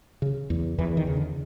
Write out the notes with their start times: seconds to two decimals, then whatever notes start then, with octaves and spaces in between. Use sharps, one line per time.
0.22 C#3
0.50 E2
0.78 E2 E3
0.97 D#3
1.07 C#3
1.17 D3